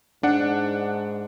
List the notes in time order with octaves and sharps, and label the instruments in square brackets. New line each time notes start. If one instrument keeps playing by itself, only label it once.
[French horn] G#2 [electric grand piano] D4 F#5